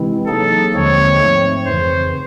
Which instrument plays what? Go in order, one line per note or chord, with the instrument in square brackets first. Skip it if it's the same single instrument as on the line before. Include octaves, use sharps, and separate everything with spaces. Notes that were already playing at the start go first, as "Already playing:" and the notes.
Already playing: [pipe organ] C3 E3 G#3 C4 E4
[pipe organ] F#3 A#3 D#4 G#4 [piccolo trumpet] A4
[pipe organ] D#2 D3 F3 G#3 C4 [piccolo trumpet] C#5
[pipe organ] G#2 F3 A3 C4
[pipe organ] F2 C#3 E3 [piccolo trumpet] C5